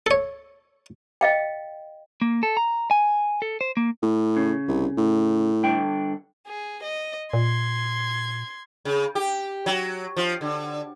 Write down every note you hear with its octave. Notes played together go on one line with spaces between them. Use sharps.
A4 C#5
D#5 F5 G5
A#3
A4
A#5
G#5
A4
C5
A#3
A2
C#3
C2
A2
G2 D3 G5
G#4
D#5
A#2 C6 G#6
C#3
G4
F#3
F3
D3